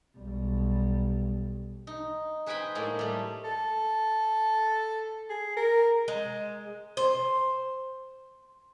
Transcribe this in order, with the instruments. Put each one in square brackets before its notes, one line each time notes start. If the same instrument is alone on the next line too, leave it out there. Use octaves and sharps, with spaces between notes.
[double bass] B1 G3
[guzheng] D#4
G#4 B4 C5 G5 G#5 B5
A2 G#3 A#3 D#4 D5
G3 A3
[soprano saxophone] A4
G#4
A#4
[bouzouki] G#3
C5